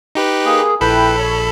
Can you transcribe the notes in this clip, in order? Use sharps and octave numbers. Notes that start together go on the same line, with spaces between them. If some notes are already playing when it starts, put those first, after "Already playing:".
D#4 G4 B4
A#3 G#4
A#1 E4 A4 B4 G5 B5
C#5